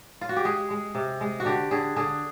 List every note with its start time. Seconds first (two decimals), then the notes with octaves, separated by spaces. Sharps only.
0.21 F4
0.29 F#4
0.36 G4
0.45 G#3 G#4
0.70 G#3
0.95 C3
1.21 G#3
1.40 F#4
1.45 D3 G4
1.71 D3 G#4
1.96 D3 G#4